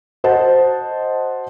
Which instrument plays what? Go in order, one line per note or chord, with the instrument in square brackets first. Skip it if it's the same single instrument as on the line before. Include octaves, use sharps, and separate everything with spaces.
[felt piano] F#4 C5 D#5 F#5 A5